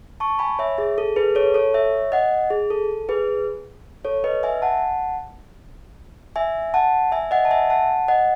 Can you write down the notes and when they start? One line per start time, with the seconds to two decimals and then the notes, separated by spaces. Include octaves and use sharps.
0.20 A5 C#6
0.39 G#5 B5
0.59 C#5 E5
0.78 G#4
0.98 A4
1.16 G#4 B4
1.35 A4 C#5
1.54 A4 C#5
1.74 C#5 E5
2.12 D#5 F#5
2.50 G#4
2.70 A4
3.09 G#4 B4
4.05 A4 C#5
4.24 B4 D#5
4.43 E5 G#5
4.62 F#5 A5
6.36 E5 G#5
6.74 F#5 A5
7.12 E5 G#5
7.31 D#5 F#5
7.45 A5
7.51 E5 G#5
7.70 F#5 A5
8.08 D#5 F#5